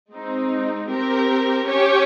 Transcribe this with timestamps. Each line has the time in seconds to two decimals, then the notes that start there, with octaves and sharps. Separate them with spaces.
0.12 G#3 C4 D#4
0.89 C4 G4 A#4
1.66 C#4 G4 C#5